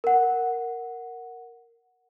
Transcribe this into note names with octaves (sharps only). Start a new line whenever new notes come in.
A#4 F#5